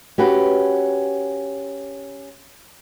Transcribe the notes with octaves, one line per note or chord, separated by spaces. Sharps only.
C#4 F#4 G4 B4